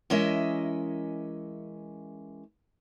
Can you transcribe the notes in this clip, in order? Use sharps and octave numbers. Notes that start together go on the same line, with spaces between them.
E3 G#3 C#4 A#4 D#5 E5